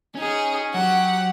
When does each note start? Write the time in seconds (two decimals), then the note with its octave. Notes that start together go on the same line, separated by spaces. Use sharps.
0.15 C#4 D#4 G#4
0.74 F#3 G4 F#5